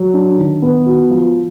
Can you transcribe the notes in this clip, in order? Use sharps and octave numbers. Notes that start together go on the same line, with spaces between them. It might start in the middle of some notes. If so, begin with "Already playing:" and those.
Already playing: F#3
D4
D#3
B3
F#4
F3